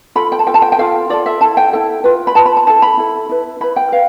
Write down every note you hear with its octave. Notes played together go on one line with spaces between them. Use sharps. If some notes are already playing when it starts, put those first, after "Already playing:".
F4 A4 B5
G5
A5
F4 A4 G5
A5
G5
G5
F4 A4 F5
F4 A4 D5
E5
E4 A4 A5
G5
E4 A4 G5
F4 B4
B5
F4 B4 A5
B5
A5
E4 A4 A5
B5
E4 A4
E4 B4
E4 B4 B5
G5
B4 F5